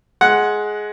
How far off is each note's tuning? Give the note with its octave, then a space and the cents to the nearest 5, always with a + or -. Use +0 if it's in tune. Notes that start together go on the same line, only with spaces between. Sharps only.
G#3 +15 F#5 +0